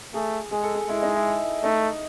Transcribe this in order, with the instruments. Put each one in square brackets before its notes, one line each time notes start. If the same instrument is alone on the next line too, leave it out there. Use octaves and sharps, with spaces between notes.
[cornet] A3 [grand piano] G#4
[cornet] G#3 [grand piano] G#4
[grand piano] A4
G#4
[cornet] G#3 [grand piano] E4
[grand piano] D#4
E4
[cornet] A3 [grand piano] D#4